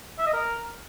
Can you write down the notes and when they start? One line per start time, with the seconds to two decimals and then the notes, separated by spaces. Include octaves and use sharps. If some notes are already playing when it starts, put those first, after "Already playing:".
0.19 E5
0.26 D#5
0.34 A#4